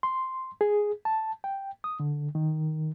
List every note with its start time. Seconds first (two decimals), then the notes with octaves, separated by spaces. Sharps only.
0.03 C6
0.61 G#4
1.05 A5
1.44 G5
1.84 D#6
2.00 D3
2.35 D#3